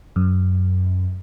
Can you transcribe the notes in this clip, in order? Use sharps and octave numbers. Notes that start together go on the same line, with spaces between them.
F#2